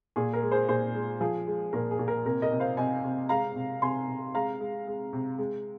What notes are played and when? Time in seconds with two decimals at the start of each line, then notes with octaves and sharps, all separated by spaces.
0.16 A#2 G#4
0.33 A#4
0.43 G#3
0.52 G#4 C5
0.68 A#2 G#4 C5
0.95 G#3
1.21 F3 G#4
1.47 G#3
1.73 A#2 A#4
1.91 G#4
1.99 A#2
2.08 A#4
2.26 C3 A#4
2.42 A#4 D#5
2.52 C3
2.60 C5 F5
2.77 C3 D#5 G#5
3.04 C3
3.29 G#3 F5 A#5
3.56 C3
3.82 C3 G#5 C6
4.08 C3
4.35 G#3 F5 A#5
4.61 G#3
4.87 G#3
5.13 C3
5.38 G#3